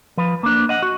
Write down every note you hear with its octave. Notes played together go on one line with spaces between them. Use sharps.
F3 B4
A#3 D4
D#5 F#5
F#4